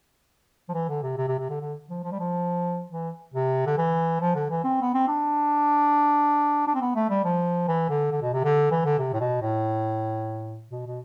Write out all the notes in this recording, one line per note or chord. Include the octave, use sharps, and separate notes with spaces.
F3
E3
D3
C3
C3
C3
C3
D3
D3
F3
F3
G3
F3
E3
C3
D3
E3
F3
D3
E3
C4
B3
C4
D4
D4
C4
B3
A3
G3
F3
E3
D3
D3
B2
C3
D3
E3
D3
C3
A2
B2
A2
B2
B2